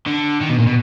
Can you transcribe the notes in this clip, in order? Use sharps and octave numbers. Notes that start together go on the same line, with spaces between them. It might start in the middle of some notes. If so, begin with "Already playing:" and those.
D3
D#3
B2
A#2
B2